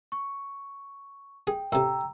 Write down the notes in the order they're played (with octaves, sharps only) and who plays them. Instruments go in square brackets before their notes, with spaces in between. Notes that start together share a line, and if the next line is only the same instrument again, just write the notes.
[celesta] C#6
[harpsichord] G#4 [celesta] G5
[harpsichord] A2 C3 [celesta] G5 A#5 E6